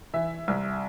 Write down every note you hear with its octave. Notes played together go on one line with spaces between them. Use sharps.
E3 E5
C2